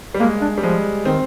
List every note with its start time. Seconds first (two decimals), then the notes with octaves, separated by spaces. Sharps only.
0.14 G3
0.20 G#3 A#3
0.41 D4
0.57 G3
0.62 F3 G#3
1.05 D#3 C4